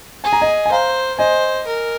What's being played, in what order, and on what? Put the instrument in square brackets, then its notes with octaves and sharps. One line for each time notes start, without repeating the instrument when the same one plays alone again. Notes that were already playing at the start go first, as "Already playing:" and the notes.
[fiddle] G#4 [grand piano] G#5
[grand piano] A#5
D#5 G#5
G#5
[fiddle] C5 [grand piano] F5 A#5
[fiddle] C5 [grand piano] D#5 G#5
[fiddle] A#4